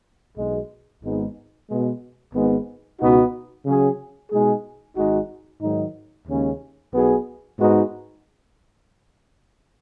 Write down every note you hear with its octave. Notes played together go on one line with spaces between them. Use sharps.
B1 B2 G#3
G#1 G#2 G#3 B3 D#4
B2 G#3 B3
G#1 G#2 G#3 B3
C#2 B2 B3 D#4 F#4
C#3 F#3 C#4 G#4
B2 G#3 D#4 G#4
G#1 G#2 G#3 D#4 F#4
G#2 D#3 F#3 D#4
D#2 C#3 G#3 C#4
B1 B2 B3 G#4
G#2 G#3 B3 D#4 F#4